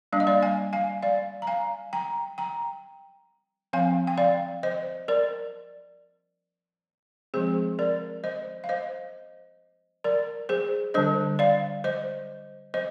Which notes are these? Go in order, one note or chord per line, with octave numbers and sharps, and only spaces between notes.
G3 A#3 D4 F5
D#5
D5 F5
F5 G#5
F5 G#5
D5 F5
A#5
F5 G#5
G5 A#5
G5 A#5
F3 C4 F5 G#5
G5
D5 F5
C5 D#5
A#4 D5
F3 G#3 C4 G#4 C5
A#4 D5
C5 D#5
F5
C5 D#5
A#4 D5
G#4 C5
D3 G3 D4 C5 D#5
D5 F5
C5 D#5
C5 D#5